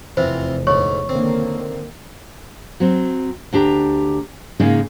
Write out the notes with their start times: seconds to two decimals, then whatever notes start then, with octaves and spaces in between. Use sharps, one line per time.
0.17 F1 E2 E3 C4 F4 C5
0.67 D2 G#2 C#5 C#6
1.09 D3 D#3 A#3 C4
2.80 F#3 C4
3.53 D2 D4 G4 A#5
4.60 G#2 C#3 G#3 A#3 D#4